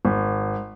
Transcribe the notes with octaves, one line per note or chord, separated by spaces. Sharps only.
G#1